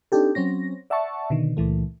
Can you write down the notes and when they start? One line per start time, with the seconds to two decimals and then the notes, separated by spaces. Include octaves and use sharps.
0.12 C4 D4 D#4 G4 A4
0.35 F#3 C4 C#4 A#6
0.90 D5 E5 F#5 A5 C#6
1.30 B2 D3 D#3
1.57 C#2 A#2 E3 A3